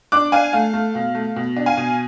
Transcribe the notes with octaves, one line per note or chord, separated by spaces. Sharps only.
D4 D6 F#6
D4 F5 G#5
A3 F5
A3
B2
A3
B2
D4
F5 G#5
B2